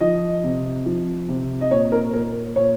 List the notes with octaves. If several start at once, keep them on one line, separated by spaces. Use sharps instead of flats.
F3 D#5
C3
F3
C3
D#5
A#2 C#5
A#4
A#2 A#4
A#2 C#5